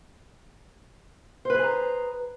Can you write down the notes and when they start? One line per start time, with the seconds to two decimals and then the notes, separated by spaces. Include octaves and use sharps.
1.45 C5
1.50 B4
1.54 G#4
1.59 G#5
1.64 A#5